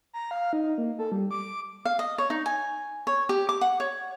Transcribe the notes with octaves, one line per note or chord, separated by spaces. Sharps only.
A#5
F5
D#4
A#3
A4
G3
D6
F5
D#5
C#5
D#4
G#5
C#5
G4
D6
F#5
C#5